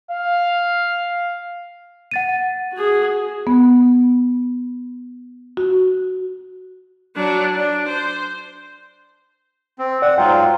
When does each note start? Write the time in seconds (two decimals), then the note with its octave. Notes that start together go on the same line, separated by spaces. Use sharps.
0.11 F5
2.11 F#5 A6 D#7
2.73 F#4 G#4
3.47 B3
5.57 F#4
7.16 F#3 D4
7.56 D4
7.88 C5
9.79 C4
10.02 D5 F#5
10.18 G#2 F#3 F4 G5